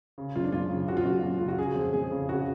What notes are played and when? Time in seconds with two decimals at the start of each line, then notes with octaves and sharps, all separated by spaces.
0.18 C#3
0.36 F#2 F4
0.44 D4
0.52 F#2 F4
0.70 C#3
0.88 C#3 F#4
0.97 F4
1.05 F#2 F#4
1.23 F#2
1.39 C#3 F4
1.48 F#4
1.58 C#3 G#4
1.76 F2
1.93 F2 G#4
2.11 C#3
2.29 C#3 F#4